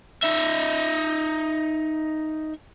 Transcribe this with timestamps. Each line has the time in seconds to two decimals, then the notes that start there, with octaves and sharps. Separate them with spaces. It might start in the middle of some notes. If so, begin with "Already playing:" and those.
0.23 D#4 E5